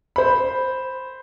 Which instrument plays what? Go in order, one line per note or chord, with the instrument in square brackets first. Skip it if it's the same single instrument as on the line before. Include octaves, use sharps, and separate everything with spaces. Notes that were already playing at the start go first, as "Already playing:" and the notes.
[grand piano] C5 B5